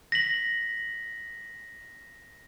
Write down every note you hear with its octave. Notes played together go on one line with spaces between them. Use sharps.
A#6 B6 F#7